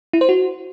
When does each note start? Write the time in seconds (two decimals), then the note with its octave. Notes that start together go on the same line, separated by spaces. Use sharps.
0.13 E4
0.21 C5
0.29 F#4